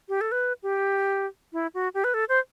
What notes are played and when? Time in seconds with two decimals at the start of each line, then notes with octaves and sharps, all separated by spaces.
0.09 G4
0.21 A4
0.32 B4
0.63 G4
1.53 E4
1.74 F#4
1.94 G4
2.04 B4
2.14 A4
2.29 C5